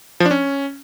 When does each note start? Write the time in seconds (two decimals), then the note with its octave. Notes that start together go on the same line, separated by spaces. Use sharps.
0.20 F3
0.26 D4
0.31 C#4